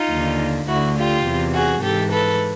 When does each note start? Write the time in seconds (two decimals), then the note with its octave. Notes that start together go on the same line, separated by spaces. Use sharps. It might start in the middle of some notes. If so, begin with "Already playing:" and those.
Already playing: D#4 F4
0.11 D#2 D3
0.67 D2 D3 E4 F#4
0.96 F4 G4
1.25 E2 C3 E3
1.54 F#4 G#4
1.82 G#2 E3 G4 A4
2.11 A4 B4